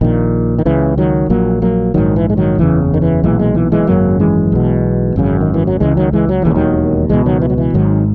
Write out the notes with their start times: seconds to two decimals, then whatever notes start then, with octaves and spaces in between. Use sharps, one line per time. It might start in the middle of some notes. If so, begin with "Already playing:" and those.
0.01 A#1 A#2 D#3
0.59 D#3
0.65 C#2 C#3 E3
0.98 D#3 F#3
1.30 A#1 A#2 F#3 A#3
1.62 F#3 A#3
1.94 A#1 G#2 D#3 F#3
2.16 E3
2.30 G#3
2.37 D#3 F#3
2.59 F#1 E2 C#3 E3
2.94 D#3
3.02 E3
3.24 B1 A#2 E3 G#3
3.39 E3 G#3
3.55 E3
3.72 E3 G#3
3.87 G#1 F#2 C#3 F#3 A#3
4.20 E3 G#3
4.52 B1 B2
5.16 G#1 F#2 C#3
5.41 D#3
5.54 E3
5.67 F#3
5.80 C#2 C#3 E3 G#3
5.97 D#3 F#3
6.13 E3 G#3
6.29 F#3
6.42 E1 D#2 C#3 E3
6.55 D#3 F#3
7.09 C#2 B2 E3 G#3
7.26 D#3 F#3
7.42 E3
7.50 F#3
7.58 E3
7.74 G#1 G#2 D#3 F#3